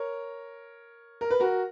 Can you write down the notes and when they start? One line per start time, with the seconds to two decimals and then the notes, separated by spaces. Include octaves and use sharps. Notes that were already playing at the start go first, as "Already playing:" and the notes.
Already playing: A#4 C#5
1.21 A#4
1.30 B4
1.40 F#4 A#4